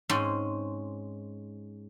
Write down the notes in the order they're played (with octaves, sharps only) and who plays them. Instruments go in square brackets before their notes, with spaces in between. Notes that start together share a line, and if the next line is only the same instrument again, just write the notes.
[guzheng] G#2 C4 C#4